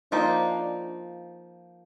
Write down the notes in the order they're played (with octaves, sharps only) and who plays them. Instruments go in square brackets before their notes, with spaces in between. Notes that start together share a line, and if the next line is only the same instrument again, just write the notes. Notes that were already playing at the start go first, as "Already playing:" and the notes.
[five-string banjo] F3 A#3 D#4 [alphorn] D4